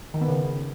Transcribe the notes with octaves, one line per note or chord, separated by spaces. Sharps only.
D#3
B3
C#3